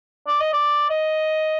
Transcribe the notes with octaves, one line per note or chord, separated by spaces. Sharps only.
D5
D#5
D5
D#5